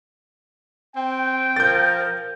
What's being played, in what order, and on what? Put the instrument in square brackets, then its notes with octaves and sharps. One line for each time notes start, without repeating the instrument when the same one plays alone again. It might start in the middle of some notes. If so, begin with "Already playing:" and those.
[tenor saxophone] C4 [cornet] G5
[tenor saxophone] F3 [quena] A#4 [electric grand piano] G6 A6